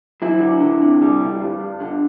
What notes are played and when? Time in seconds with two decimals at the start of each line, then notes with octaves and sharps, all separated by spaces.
0.22 F#3 E4
0.41 D3
0.60 D3
0.81 C3
1.01 G3
1.21 D2
1.40 G2
1.61 G2
1.80 D3